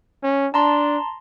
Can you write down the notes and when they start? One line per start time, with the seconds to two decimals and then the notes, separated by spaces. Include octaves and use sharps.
0.23 C#4
0.54 D4 A5 A#5 C6